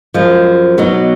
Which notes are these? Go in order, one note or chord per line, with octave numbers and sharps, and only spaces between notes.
F#2 F3 G#3
B2 F#3 B3 D#4